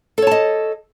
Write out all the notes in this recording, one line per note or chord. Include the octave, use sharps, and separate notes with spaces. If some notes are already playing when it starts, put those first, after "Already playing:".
A4 C#5 D#5 A5